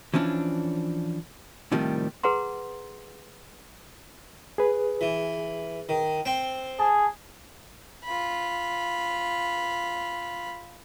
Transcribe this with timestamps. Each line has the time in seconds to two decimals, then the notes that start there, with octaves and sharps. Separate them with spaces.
0.14 E3 F3 C#4 D4
1.72 A2 C3 D#3 F3 G3
2.23 G#4 B4 F#5 A#5 C6
4.58 G#4 B4
5.01 E3
5.89 D#3
6.25 C4 G5
6.80 G#4 A5
8.05 F4 B5